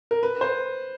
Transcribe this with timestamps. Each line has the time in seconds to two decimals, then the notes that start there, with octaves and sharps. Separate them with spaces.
0.11 A#4
0.23 B4
0.41 C5